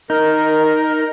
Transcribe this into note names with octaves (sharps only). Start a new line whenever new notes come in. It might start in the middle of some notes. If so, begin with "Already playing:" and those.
D#4 A#4